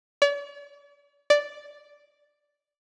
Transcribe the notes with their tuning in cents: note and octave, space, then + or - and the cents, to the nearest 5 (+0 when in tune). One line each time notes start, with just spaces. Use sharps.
D5 -45
D5 -5